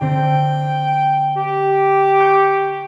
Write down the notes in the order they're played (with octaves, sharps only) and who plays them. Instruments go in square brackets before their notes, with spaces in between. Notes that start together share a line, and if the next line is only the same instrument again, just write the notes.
[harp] D3 C4 [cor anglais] G5
[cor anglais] G4
[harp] C#6 G6